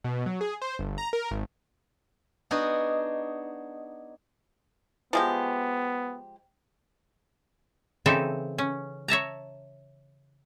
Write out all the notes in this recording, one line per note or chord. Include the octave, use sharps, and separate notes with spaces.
B2
F#3
G#4
C5
G1
A#5
A#4
G#1
B3 D4 D#4 F#4 G#4
F3 G#3 B3 G4
C#3 E3 C4 D#4 A4 E5
C#4
C#5 E5 A5 A#5